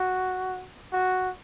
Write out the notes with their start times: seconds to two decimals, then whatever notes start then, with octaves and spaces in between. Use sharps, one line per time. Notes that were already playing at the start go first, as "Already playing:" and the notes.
Already playing: F#4
0.93 F#4